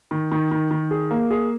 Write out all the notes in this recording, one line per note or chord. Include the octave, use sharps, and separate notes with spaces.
D#3
D#3
D#3
D#3
G#4
A#3
G#4